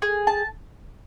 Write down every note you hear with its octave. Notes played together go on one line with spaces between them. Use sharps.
G#4
A5